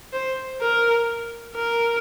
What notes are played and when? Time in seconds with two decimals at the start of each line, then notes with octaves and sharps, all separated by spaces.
0.13 C5
0.62 A#4
1.56 A#4